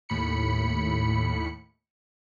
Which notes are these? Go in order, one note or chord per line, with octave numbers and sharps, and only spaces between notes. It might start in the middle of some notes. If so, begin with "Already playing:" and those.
D#2 A2 B5 C#7